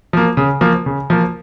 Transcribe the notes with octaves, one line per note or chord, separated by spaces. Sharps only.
F3 A#3
C#3
F3 A#3
C#3
F3 A#3